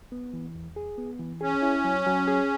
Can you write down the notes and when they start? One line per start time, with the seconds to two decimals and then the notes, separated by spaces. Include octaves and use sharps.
0.12 B3
0.33 E3
0.55 E2
0.76 G#4
0.98 B3
1.19 E3
1.41 C#4 G#4
1.62 E4
1.84 F#3
2.07 F#3
2.28 G#4